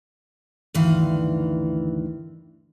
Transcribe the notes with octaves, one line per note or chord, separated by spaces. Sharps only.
D2 G2 D#3 E3 F5